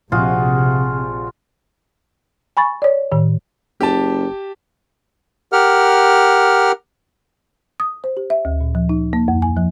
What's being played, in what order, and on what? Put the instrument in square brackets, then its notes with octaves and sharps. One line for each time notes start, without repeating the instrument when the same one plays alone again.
[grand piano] A#1 [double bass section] C3 [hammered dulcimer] F4 F#4 G#4
[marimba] G#5 B5 C#6 A6
C#5 D5
A2 D#3
[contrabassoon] F#1 [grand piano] G4 A5
[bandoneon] G4 A#4 F#5 F6
[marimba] D#6
C5
G4
E5
D2
A#2
F3
D#4
A#3
F2
G#5
F3